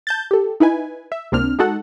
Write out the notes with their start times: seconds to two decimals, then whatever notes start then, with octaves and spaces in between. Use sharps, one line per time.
0.07 A5 G6 A6
0.31 G4 A4
0.60 D#4 E4 B4 G#5
1.12 E5
1.32 C#2 C3 A#3 C4 D4 F6
1.59 G#3 D#4 F#4 A4 F#5